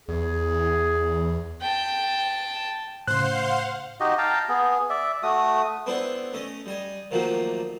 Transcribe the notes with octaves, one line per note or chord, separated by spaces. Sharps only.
E2 G#4
G5 A5
A2 C#3 C5 F5 F#5 C6 F#6
D#4 F#4 G4 D#5
F5 G5 A5 A#5
B3 G#4
D5 E5
A3 F#4 D#6
B3 C4 D4 E4 A4 A5
A3 C#4 D#5
G3 D#5 G#5
D#3 F3 F#3 A3 A#3 D4